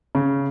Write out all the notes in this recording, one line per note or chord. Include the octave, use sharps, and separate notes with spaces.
C#3